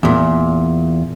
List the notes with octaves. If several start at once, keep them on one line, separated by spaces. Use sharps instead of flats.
E2 A#2